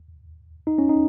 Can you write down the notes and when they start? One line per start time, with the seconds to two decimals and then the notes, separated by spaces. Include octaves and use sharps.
0.67 D#4
0.78 C#4
0.89 D#4